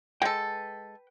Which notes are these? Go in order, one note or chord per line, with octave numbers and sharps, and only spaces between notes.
G#3 A4 B4 G5